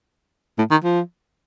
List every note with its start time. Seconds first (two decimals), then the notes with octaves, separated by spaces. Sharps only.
0.58 A2
0.71 D#3
0.84 F3